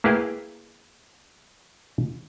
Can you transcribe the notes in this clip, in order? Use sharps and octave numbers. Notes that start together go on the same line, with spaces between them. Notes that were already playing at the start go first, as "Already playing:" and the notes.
A#3 E4 G#4 B4 F5 G5